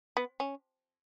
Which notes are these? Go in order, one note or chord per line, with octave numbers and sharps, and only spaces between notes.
B3
C#4